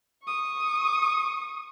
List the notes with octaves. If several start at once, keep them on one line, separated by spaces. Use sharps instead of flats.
C#6 D#6